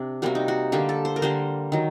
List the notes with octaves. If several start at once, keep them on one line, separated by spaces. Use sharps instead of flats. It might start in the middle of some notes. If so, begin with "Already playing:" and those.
Already playing: C3 D4
C3 G3 A#3 F#4
D#4
F#4
D3 G3 A#3 G4
A4
C5
A#4
D3 G3 A#3 C5
D#3 F#3